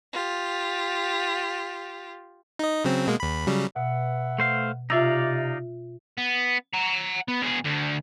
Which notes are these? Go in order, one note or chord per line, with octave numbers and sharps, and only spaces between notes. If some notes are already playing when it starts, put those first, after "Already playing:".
F4 G4
D#4 D#5
C#3 F#3 C4
B2 G#3 A#3
D#2 B5
C#3 F#3 G3
B2 B4 E5 F#5
A3 C5 F5
C3 D#4 F4 D5 E5 F5 E6
B3
F#5 A#5
B3
B2 G#4
D2 D3